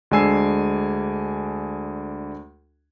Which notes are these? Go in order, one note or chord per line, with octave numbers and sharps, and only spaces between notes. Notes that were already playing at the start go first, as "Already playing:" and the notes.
D2 G#3 D4 G#5 E6 C7